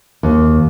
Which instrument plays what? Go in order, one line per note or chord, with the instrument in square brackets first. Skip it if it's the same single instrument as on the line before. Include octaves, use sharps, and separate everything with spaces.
[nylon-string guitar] D#2